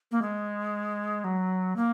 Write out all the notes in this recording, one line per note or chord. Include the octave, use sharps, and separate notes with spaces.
A#3
G#3
F#3
A#3